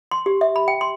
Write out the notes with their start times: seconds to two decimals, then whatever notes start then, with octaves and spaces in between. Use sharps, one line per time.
0.11 C6
0.26 G4
0.41 E5
0.56 B5
0.68 G5
0.81 C6